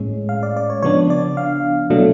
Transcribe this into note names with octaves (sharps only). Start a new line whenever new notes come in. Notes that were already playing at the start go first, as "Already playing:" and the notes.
Already playing: A2 G#3 C#4
F5
D5
D5
C#5
C#3 F3 B3 D4 C#5
D5
F5
B2 F#3 A3 D4